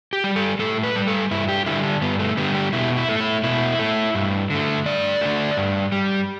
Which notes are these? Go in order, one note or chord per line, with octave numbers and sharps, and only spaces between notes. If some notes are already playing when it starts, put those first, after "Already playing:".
G4
G3
A4
A2 A4
B4
G3
A4
G2 E4
G4
D3 G3 E4
D4
G2 B3
A3
D3 G3 B3
G4
B2 E4
E4
A3
E4
B2 E4
A3
G2
D3 A3
G2 D5
D3 A3
G2
G3